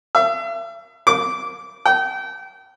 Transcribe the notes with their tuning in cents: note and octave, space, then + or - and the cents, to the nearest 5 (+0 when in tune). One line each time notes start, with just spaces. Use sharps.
E5 +40
D6 -15
G5 -35